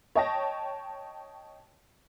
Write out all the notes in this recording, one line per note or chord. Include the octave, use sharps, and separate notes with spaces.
C#5 D#5 G5 A5 A#6